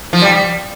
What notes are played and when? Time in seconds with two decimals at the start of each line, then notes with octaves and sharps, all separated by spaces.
0.13 F3
0.22 G3